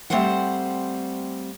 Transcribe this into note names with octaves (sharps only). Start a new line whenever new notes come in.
G3 A3 C4 B4 C5 F#5